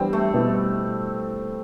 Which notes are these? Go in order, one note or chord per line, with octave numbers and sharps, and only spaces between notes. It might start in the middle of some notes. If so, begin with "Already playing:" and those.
Already playing: E3 G3 B3 C4 D4 G4
A3
B2 G3 B3 E4